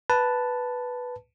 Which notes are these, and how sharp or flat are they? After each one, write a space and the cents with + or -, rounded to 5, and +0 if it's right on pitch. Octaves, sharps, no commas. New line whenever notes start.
B4 +0 A5 +0